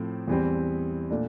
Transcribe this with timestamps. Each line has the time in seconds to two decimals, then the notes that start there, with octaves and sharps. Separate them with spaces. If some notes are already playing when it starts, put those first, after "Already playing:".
Already playing: A2 F3 C4
0.28 E2 E3 G3 C4
1.10 A#2 A3 D4